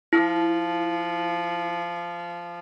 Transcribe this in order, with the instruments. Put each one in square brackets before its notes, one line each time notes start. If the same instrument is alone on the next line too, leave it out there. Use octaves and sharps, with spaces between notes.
[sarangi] F3 [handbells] E4